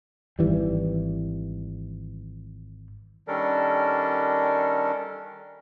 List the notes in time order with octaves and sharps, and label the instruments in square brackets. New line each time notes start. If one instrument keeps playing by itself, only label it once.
[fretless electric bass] G#1 D#3 E3 G3
[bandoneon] D#3 G3 C#4 D4 A4 A#4